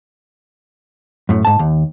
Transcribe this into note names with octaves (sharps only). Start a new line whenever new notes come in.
F#2 A2
G#2 A5
D#2